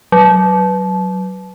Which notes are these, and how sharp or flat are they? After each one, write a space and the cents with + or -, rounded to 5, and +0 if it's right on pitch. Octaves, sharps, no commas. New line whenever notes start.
F#3 +15